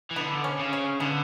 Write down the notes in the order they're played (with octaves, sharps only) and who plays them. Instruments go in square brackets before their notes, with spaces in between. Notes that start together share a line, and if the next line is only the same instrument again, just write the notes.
[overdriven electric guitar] E3
[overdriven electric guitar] D3 [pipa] B3
[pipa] C#4
[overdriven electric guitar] C#3
[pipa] C#4
[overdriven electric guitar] D3 [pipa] B3